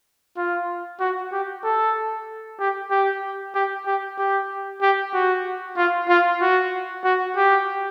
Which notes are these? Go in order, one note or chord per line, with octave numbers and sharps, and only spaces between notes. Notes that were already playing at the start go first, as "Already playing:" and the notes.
F4
F#4
G4
A4
G4
G4
G4
G4
G4
G4
F#4
F4
F4
F#4
F#4
G4